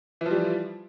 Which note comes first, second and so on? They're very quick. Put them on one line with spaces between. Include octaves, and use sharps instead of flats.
E3 F3 G3